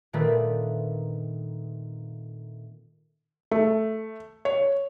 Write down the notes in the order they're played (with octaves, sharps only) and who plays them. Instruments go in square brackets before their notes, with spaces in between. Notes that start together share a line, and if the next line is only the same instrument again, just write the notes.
[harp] A#2 D#3 A3 C4 D4 B4
[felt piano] A3
C#5